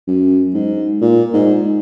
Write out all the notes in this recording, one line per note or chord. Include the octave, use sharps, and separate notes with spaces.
F#2
G#2
A#2
G#2